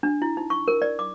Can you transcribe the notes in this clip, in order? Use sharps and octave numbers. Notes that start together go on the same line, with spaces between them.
D4
E4
D#4
C#6
A#4
D5
D6